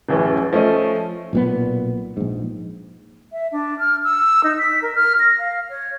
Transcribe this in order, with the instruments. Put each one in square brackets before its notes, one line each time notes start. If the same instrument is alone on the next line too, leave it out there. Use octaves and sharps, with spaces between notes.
[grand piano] D1 A1 E3 C#4
F3 A3 C#4 D#5
[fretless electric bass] B1 A#2 B3
A#1 G#2
[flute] E5
D4
F6
E6
D#4
B6
A#4
F6
A#6
F5
C#5